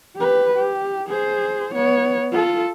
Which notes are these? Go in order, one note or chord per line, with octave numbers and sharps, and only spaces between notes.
G4 B4
G4
G#4 C5
B3 C#5
F4 A4